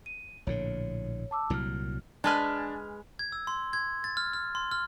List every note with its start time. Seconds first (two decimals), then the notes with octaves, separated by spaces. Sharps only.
0.06 D#7
0.47 A#1 A2 D3 C#5
1.31 A5 D6 E6
1.50 C2 A#2 F#3 E4 F6
2.24 G#3 D4 B4 G#5 A5 F6
3.19 G#6
3.32 E6
3.47 C6
3.73 G#6
4.04 A6
4.17 F6
4.33 F6
4.55 C6
4.71 F6